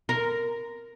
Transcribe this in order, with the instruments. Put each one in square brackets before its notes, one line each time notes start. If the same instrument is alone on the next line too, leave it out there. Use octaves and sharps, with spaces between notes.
[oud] A#4